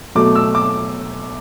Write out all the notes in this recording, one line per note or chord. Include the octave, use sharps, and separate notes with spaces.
B2 F#3 A3 D6
E6
D6